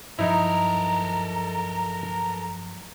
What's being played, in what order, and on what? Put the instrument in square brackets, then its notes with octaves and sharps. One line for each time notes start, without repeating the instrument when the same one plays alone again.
[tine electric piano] G2 F3 F#3 [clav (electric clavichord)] D#4 E4 [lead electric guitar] A4 A#4 [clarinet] A#5